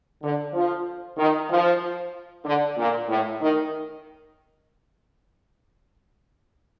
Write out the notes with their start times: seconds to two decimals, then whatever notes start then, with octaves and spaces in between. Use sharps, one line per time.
0.21 D3
0.52 F3
1.17 D#3
1.49 F3
2.44 D3
2.76 A#2
3.07 A2
3.40 D#3